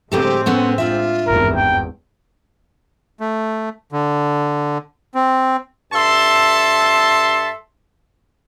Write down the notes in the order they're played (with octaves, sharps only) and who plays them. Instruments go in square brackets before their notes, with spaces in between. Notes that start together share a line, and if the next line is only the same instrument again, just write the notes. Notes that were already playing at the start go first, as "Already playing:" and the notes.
[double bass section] A2 G#3 C4 [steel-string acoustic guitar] D3 F#3 A4 [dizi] G4
[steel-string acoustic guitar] B3 C#4 A4 [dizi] F#5
[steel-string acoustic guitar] D4 E5 [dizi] F4
[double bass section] G#1 E2 G2 [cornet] A#4
[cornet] G5 [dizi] A#5
[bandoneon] A3
D3
C4
[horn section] G2 A4 E5 A5 C6